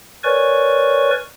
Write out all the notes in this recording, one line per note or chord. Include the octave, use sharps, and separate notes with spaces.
A#4 B4 C#5 D5 G#5 C#6